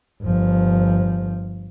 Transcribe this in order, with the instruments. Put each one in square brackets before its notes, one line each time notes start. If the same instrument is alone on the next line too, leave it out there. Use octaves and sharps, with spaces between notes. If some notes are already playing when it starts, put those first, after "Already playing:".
[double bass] G1 F3